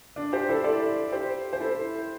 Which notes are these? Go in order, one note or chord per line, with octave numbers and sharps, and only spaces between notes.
D4
G4 C5
E4 A4
A4 D5
G4 C5
C5
E4 A4